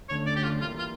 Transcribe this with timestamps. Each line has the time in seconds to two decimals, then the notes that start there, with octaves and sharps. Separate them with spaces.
0.09 D2 D3 A3 C#4 C#5
0.26 D5
0.36 G4
0.43 F4
0.61 E3 G3 A#3 F4
0.78 F4